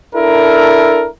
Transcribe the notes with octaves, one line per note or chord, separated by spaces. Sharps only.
D4 E4 A4 A#4